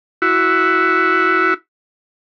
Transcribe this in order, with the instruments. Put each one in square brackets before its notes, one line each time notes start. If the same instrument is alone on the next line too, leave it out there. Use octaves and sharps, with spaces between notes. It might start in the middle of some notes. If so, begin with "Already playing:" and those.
[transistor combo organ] E4 F#4